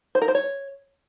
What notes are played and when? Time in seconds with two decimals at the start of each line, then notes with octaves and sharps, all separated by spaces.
0.15 C5
0.22 A#4
0.28 C5
0.35 C#5